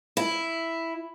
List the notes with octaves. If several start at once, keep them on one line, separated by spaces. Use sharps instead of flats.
E4